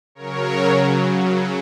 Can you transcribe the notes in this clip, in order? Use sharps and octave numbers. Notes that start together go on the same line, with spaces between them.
C#3 F#3 A#4 C#5